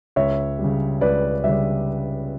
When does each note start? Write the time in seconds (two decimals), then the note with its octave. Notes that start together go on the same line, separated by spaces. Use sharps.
0.16 C#2 C#5 E5
0.59 G3
0.64 C#3
1.01 C#2 B4 D5
1.44 G3 E5
1.48 C#3 D5